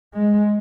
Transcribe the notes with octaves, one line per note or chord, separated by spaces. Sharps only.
G#3